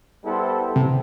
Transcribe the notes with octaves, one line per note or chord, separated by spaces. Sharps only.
G3 B3 E4 A4 C5
C3